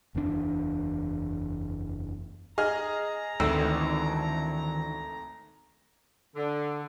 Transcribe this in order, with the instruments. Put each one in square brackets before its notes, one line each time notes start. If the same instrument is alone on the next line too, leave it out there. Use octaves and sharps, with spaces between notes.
[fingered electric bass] F#1 E2 B2 D4
[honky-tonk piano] G#4 D#5 F6 [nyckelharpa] A#5
[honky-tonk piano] G#1 A3 E6 [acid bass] D2 [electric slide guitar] D#3 E3 C4
[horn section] D3